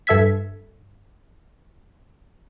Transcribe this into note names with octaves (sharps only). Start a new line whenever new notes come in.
G2 A4 E5 E6 G#6 B6